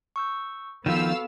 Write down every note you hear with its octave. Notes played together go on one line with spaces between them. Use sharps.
C#6 E6 G6
D#3 F3 B3 F#4 A4 F5 E6